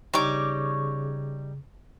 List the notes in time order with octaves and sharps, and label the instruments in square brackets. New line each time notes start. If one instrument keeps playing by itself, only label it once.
[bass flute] C#3 [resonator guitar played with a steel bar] G3 D#4 [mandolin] C#5 D6